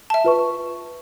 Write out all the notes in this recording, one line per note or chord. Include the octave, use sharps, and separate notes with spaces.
E5 A5
F4 B4 C#6